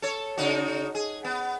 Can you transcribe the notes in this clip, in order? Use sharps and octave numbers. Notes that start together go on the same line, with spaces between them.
A4 C#5
C#3 D#4 F#4
G#4
B3